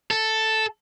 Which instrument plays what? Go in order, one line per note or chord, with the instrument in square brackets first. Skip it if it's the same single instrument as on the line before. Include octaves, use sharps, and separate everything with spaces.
[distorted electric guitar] A4